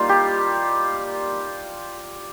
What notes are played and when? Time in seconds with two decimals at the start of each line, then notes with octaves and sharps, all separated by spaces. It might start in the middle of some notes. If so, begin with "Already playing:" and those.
Already playing: G3 A#3 D#4 F4
0.09 G4